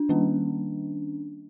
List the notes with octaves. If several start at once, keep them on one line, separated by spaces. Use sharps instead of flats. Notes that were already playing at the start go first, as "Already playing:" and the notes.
Already playing: D4
D#3 G3 A#3 C#4